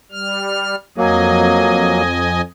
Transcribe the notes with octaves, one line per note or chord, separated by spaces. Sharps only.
G3 F6
F2 F#3 A#3 D#5 G#5